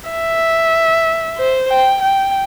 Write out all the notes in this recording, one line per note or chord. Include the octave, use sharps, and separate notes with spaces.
E5
C5
G5
G5